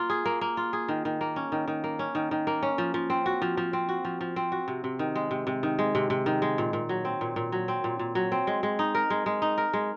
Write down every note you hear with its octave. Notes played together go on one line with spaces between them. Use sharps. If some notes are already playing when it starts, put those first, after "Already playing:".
Already playing: A#3 F4
G#4
A#3
A#3
F4
G#4
D#3
D#3
A#3
C#4
D#3
D#3
A#3
C#4
D#3
D#3
A#3
C#4
F3
F3
C4
F#4
F3
F3
C4
F#4
F3
F3
C4
F#4
C3
C3
D#3
G#3
C3
C3
D#3
G#3
C3
C3
D#3
G#3
A#2
A#2
F#3
C4
A#2
A#2
F#3
C4
A#2
A#2
F#3
C4
G#3
G#3
D#4
A#4
G#3
G#3
D#4
A#4
G#3